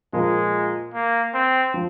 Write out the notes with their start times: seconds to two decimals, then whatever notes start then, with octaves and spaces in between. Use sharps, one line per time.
0.13 A#2 F3 G#3 A#3 F4
0.94 A#3
1.34 C4
1.74 F3